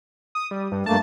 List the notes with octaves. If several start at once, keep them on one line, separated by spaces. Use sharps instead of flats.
D#6
G3
G2
G2 A3 A#3 A5